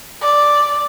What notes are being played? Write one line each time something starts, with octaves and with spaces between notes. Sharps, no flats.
D5